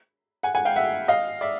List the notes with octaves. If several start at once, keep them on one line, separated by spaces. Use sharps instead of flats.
F#5 G#5
F#5 G#5
F5 G5
E5 F#5
D#5 F5
D5 E5